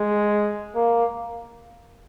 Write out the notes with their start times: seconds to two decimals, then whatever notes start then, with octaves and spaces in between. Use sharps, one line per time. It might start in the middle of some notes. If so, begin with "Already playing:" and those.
Already playing: G#3
0.75 A#3